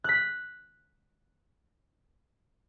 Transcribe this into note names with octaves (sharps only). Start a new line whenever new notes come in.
F#6 B6